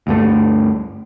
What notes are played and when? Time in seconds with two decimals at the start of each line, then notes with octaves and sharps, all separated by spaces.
0.07 D2 G2 A3